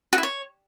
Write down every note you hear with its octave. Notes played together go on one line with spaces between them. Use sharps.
F#4
E4
C#5